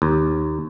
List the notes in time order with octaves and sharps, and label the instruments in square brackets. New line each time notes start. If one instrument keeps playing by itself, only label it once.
[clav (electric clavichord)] D#2